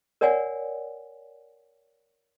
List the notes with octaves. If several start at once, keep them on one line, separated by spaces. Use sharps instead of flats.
A#4 C#5 D5 F#5 G#5